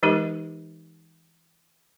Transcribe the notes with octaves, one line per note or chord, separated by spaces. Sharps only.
E3 G#3 D#4 G4 A#4